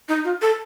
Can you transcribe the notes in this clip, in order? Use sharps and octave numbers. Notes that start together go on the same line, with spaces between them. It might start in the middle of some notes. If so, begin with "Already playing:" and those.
D#4
F4
A4